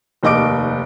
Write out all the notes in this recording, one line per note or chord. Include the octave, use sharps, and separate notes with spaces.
F1 D#2 D#5 D6 D7